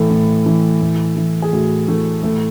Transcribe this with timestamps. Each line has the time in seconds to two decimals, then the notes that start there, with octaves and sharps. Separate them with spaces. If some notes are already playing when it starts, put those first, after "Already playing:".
Already playing: A2 E3 A4
0.10 A2
0.46 E3
0.82 A2
1.16 E3
1.42 G#4
1.52 A2 F#4
1.88 E3 A3
2.23 A2 A3